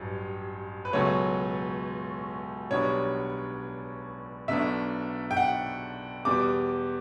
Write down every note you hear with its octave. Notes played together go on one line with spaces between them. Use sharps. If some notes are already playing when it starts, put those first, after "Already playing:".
Already playing: A1 G2 F#3
B4
C#2 B2 F#3 A3 C#5
B1 B2 G3 B3 D4 C#5
B1 B2 A3 D4 E5
G5
F#5
E2 B2 G3 D6